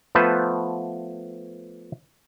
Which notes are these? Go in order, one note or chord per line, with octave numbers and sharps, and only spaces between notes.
F3 A3 B3 B4 C5